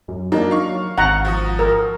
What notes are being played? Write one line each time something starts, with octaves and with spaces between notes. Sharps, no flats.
F#2
F#3 A#3 D4 D#4
F5 C#6
G#1 F#5 A#5
F3 F#4 D#6
A#4